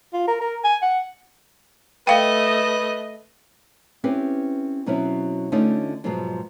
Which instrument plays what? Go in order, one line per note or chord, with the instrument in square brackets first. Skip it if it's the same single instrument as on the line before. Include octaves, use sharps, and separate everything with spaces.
[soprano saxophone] F4
A#4
A#4
G#5
F#5
[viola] A3 D#5 [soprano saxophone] B4 [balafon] F5 G5
[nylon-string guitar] C4 C#4 E4 G4 B4
B2 F#3 C4 C#4 E4
D3 A3 C#4 D#4 F4
G#2 B2 F3 F#3 G#3